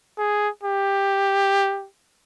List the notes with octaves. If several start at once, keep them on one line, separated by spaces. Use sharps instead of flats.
G#4
G4